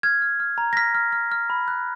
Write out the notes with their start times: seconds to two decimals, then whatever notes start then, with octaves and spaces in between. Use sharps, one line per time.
0.03 F6 G#6
0.22 F6
0.40 F6
0.58 A#5
0.73 A#6
0.77 F6 B6
0.95 F6
1.13 F6
1.32 F6
1.50 B5
1.68 F#6